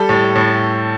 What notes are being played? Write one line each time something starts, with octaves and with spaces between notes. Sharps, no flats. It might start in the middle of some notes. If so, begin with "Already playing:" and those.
Already playing: G3 A4
A2
A2